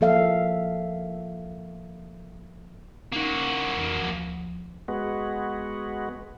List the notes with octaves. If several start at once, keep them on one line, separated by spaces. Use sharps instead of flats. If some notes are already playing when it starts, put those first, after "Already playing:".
F3 A#3 A4 E5 F5
A#3 C#4 D#4 F#4
F2 E3
D2 F3
G#3 B3 F#4